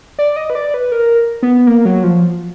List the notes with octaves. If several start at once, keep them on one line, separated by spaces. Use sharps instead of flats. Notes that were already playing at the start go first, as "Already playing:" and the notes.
D5
D#5
B4
D5
B4
A#4
B3
A#3
F#3
F3